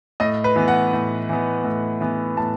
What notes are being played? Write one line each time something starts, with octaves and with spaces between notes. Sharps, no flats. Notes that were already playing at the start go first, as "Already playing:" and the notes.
A2 D#5
B4
E3 B3
F#5
A2
E3 B3
A2
E3 B3
A2 A5